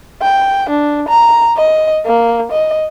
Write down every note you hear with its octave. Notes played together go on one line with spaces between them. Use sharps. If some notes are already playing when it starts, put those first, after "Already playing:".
G5
D4
A#5
D#5
A#3
D#5